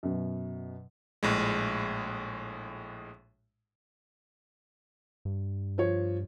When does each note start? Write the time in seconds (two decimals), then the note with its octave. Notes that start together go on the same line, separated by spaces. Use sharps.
0.03 F#2 B2
1.23 A#1 A2 G#3
5.25 G2
5.78 F3 C#5